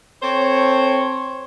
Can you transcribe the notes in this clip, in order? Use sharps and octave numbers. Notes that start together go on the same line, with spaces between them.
C4 A4 C5 C#5